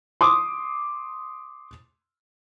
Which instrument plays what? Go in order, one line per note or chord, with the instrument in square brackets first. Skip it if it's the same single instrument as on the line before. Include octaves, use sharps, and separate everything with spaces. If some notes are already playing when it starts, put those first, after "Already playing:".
[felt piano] C6 D6 D#6